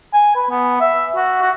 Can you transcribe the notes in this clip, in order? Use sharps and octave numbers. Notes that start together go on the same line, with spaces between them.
G#5
B4
B3
E5
F#4
F#4